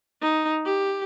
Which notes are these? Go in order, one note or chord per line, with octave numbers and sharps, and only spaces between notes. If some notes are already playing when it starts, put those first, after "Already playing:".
D#4
G4